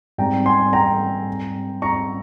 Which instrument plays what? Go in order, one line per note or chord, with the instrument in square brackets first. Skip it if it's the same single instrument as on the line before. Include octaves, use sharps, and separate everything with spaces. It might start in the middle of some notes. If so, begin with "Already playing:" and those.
[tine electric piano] G#2 G3 C4 [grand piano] G5 A#5
[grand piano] G#5 C6
G5 A#5
A#5 C#6